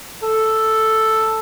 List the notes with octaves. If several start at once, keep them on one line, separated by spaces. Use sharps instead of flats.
A4